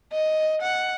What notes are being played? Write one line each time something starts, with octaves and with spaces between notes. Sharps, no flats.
D#5
F#5